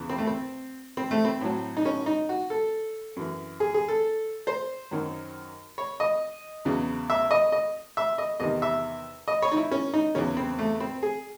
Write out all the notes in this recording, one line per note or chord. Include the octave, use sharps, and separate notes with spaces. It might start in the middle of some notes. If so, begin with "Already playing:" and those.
Already playing: E2 C#3 E3
C4
A3
C4
C4
A3
C4
A2 F#3
D#4
C#4
D#4
F#4
A4
F#2 E3
G#4
G#4
A4
C5
F#2 D#3 F#3
C#5
D#5
E2 C#3 F#3
E5
D#5
D#5
E5
D#5
E2 C3 D#3 D#5
E5
D#5
C#5
D#4
E4
C#4
D#4
E2 C#3 F#3 C#4
C4
A3
C4
G#4